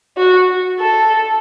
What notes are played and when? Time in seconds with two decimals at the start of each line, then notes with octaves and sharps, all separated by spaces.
0.17 F#4
0.79 A4